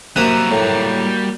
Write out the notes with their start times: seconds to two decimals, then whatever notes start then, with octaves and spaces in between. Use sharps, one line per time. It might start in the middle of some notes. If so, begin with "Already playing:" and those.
0.16 C3 F#3 G3 A#3 E5 A#5 D#6 F#6
0.51 A2